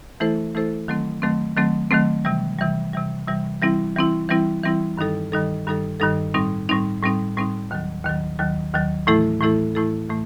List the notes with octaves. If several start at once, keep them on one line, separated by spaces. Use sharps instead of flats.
E3 A3 E4 A4 C5
E3 A3 E4 A4 C5
D#3 F#3 A3 C4
D#3 F#3 A3 C4
D#3 F#3 A3 C4
D#3 F#3 A3 C4
C3 E3 G3
C3 E3 G3
C3 E3 G3
C3 E3 G3
E3 G3 C4 E4
E3 G3 C4 E4
E3 G3 C4 E4
E3 G3 C4 E4
G2 D#3 G3 D#4 A4
G2 D#3 G3 D#4 A4
G2 D#3 G3 D#4 A4
G2 D#3 G3 D#4 A4
A2 G3 C4 D#4
A2 G3 C4 D#4
A2 G3 C4 D#4
A2 G3 C4 D#4
D#2 D#3 F#3
D#2 D#3 F#3
D#2 D#3 F#3
D#2 D#3 F#3
A2 E3 A3 E4 A4
A2 E3 A3 E4 A4
A2 E3 A3 E4 A4
A2 E3 A3